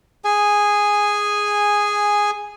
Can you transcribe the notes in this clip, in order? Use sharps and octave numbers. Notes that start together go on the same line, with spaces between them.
G#4 G#5